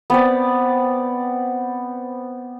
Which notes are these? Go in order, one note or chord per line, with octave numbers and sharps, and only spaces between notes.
B3 C4 D5